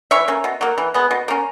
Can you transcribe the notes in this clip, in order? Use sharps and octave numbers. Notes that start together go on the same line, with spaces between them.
E3 C#5 E5
A#3 C#4
B2
F#3 A#3
E3
G#3 B3
B2
A#3 C#4